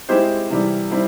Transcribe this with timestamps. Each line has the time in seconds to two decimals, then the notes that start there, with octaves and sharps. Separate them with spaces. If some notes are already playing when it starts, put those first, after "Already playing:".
0.09 G#3 C4 E4 G4 C5
0.50 C3 E3 G3
0.91 G3 C4 E4